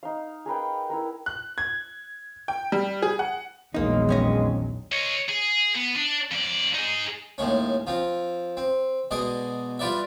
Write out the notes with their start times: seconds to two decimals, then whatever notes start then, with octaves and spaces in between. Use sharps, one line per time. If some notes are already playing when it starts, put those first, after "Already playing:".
0.03 D#4 F5
0.46 G#4 A#4 B4 G5
0.90 E4 A#4
1.26 F#6
1.58 G#6
2.48 G5
2.72 G3
3.02 G#4
3.19 F#5
3.74 A#1 E2 A#2 D#3 F#3 G#3 A#3 D#4
4.09 F2 C#4 D#5
4.92 C#5 D#5
5.29 G#4
5.76 B3
5.96 D4
6.31 F2 D5
6.75 D#4 G#4
7.38 D#2 A2 G#3 C#4
7.87 F3 C4
8.57 C4
9.11 B2 G#3 D5 D#5
9.79 G3 F4 B4 D5 E5